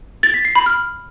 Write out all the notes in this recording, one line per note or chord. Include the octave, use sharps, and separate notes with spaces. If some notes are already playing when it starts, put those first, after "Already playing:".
A6
B6
C7
B5
F6